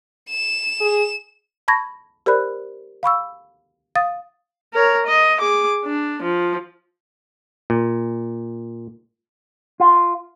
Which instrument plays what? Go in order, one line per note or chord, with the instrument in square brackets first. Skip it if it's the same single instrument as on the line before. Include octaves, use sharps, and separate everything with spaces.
[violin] E7
[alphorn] G#4
[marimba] A5 B5 C#6 G#6 A#6
G4 A#4 C5 D5 B5 F#6
F5 B5 C#6 E6
F5 D#6 A6
[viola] A#4 C#5
D#5
G#4 D6
D4
F3
[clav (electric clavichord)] A#2
[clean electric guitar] F4